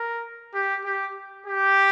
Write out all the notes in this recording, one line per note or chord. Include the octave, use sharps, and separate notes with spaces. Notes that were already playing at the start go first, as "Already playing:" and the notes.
Already playing: A#4
G4
G4
G4